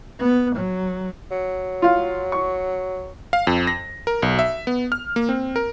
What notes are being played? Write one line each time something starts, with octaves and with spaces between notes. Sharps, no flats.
B3
F#3
F#3
F4 F5
C#6
F5
F2
A#6
A#4
B1
E5
B3
F6
A#3
C4
A#4